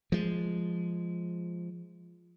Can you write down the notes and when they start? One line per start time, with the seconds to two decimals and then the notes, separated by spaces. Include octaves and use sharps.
0.12 F3 G#3